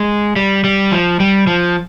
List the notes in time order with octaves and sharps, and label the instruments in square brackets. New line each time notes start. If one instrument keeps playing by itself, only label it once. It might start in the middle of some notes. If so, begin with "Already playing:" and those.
Already playing: [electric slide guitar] G#3
G3
G3
F3
G3
F3